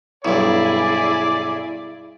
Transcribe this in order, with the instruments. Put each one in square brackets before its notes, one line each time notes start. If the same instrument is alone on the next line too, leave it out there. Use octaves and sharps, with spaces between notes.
[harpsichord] B1 G2 [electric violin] E4 G#4 [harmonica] D5